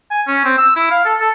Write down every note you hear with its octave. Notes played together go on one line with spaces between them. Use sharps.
G#5
C#4
C4
E6
E4
F5
A4
A4